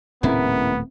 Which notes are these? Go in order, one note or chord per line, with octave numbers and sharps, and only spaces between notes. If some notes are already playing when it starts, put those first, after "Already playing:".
D#1 A2 C#3 A3 B3 C4 E4 A#4